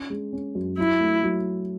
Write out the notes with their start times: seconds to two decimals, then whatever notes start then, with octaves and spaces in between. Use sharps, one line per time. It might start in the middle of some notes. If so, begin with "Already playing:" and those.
Already playing: C#4
0.10 G#3
0.33 C#4
0.55 F#2
0.78 F#3 E4
1.01 A3
1.23 F#3